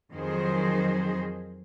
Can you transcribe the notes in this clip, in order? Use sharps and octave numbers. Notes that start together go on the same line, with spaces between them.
F2 D#3 F#3 G#4 C5